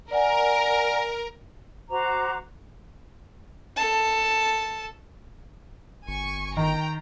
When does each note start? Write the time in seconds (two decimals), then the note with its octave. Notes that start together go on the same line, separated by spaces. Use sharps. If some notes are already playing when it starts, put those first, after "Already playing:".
0.11 A#4 D5 F#5 G#5
1.90 F#4 C5 A#5 D6
3.76 A4 A5
6.08 G1 G#5 C#6
6.57 D#3 G5 A#5